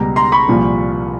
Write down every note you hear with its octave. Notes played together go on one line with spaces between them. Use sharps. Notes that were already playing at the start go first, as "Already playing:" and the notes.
Already playing: C#2 B2 G3 A#5
A#5 C6
B5 C#6
C2 A#2 F3